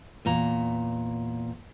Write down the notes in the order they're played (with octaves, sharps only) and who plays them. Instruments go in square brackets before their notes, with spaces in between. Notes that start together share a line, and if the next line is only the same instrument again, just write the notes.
[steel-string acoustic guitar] E2 A#2 A#5